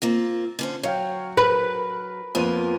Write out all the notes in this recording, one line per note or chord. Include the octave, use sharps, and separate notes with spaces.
A#3 C4 F4
D3 C#4 C5
F#3 C#5 F5 G5
A#4 B4 B5
F2 A#3 B3 F4 D#7